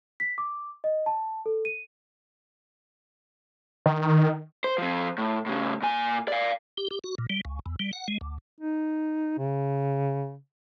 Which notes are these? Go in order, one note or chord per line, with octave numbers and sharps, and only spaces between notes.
B6
D6
D#5
A5
A4
D#7
D#3
C5
F3 C4
A2
A2 C#3
A#2 G#5
D5 F5
G4
G4
F#4
A#2
G3
C#2
E2
G3
F#5
G#3
D2
D#4
C#3